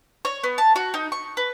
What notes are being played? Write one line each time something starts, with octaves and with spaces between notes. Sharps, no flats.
C#5
B3
A5
F#4
D#4
C#6
B4